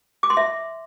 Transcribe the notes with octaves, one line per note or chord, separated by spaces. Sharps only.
D6
C6
E5